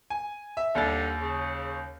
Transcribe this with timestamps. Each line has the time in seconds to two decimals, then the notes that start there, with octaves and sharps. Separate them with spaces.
0.10 G#5
0.57 E5
0.75 D#2 D3 G3 A6
1.21 C#3